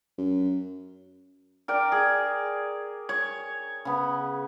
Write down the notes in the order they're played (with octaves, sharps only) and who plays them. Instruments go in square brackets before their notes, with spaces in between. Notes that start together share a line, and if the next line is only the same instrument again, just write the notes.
[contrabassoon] F#2
[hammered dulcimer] A#4 D5 G5
G#4
C#5
C#3 B3